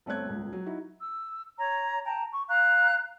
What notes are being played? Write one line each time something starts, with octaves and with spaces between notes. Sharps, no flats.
G1 A3 C4 C#5 F#6 G#6
D#1 C#2
F#3
D#4 E4 F#4
E6
C#5 A#5
G5 A5 A#5
C#6
F5 A#5 F#6